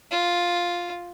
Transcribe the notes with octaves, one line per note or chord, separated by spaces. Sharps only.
F4